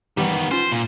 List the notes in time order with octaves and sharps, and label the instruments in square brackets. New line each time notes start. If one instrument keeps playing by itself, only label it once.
[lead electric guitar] D#3 B3 [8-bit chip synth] E3 G3 G4
[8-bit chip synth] C#4 F4 [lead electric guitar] C5
[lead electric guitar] A#2